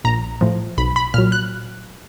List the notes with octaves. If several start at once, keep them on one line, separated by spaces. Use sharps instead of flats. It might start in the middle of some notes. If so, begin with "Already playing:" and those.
A#1 A#5
A2 F3
B1 B5
B5
A#2 F#3 F6
F#6